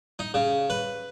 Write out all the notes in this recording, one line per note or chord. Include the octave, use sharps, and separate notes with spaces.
D#4
C#3
B4